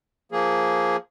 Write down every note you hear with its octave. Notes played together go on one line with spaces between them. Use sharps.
F3 A#3 G#4